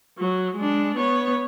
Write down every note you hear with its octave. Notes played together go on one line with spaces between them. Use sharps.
F#3
G#3 D4
B3 C#5